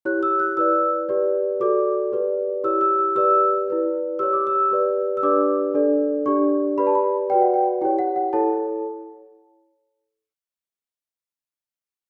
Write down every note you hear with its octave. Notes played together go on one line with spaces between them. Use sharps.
E4 G4 C#5 F#6
E6
F#6
E4 B4 D5 E6
G4 B4 D5
F#4 A4 D5 D6
G4 B4 D5
E4 G4 C#5 E6
E6
E6
G4 B4 D5 E6
E4 B4 D5
G4 C#5 E6
D6
E6
G4 B4 D5
E6
D4 G4 B4 D5 D6
D4 A4 D5
D4 G4 D5 C#6
G4 B4 D5 B5
A5
B5
F#4 B4 D5 G5
F#5
G5
E4 G4 C#5 G5
F#5
F#5
E4 A4 C#5 A5